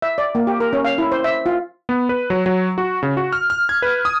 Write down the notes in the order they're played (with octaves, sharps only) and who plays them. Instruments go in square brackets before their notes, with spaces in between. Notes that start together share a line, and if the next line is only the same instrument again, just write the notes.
[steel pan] E5
D5
A#3
G4
A#4
C#4
F5
E4
C5
E5
F4
[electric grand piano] B3
B4
F#3
F#3
F#4
C#3
F#4
F6
F6
G#6
B4
D#6